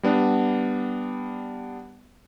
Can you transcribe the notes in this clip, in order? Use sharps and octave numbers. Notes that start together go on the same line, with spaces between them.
G3 B3 D4